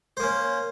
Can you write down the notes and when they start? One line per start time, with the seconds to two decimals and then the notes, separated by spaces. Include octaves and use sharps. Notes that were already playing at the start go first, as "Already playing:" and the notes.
0.17 C5
0.20 A#3
0.23 C#4